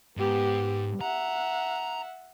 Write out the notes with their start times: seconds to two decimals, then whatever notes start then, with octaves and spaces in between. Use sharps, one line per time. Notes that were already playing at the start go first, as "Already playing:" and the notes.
0.17 G#2 B3 G4
1.01 E5 F#5 A#5